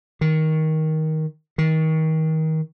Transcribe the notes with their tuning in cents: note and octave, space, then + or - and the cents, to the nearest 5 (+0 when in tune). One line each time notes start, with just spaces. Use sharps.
D#3 +15
D#3 +30